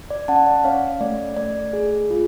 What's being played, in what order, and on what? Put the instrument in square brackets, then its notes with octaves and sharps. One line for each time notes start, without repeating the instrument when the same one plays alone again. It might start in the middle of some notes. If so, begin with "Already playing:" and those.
[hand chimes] D5
C#4 F#5 A5
D5 F#5
C#4 C#5 F5
A3 D5
A3 D5
G#4
F4